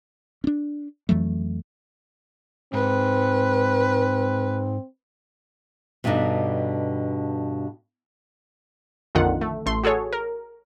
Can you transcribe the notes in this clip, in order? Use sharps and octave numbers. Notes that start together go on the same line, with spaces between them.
C#4 D4
F2 E3 F#3 A3
G#2 C4 B4
G2 B2 D3 G3 D4 D#4
A#1 F2 D3 D#3 F4 F#5
A3
A1 A3 C6
F#4 G#4 A4 C#5
A#4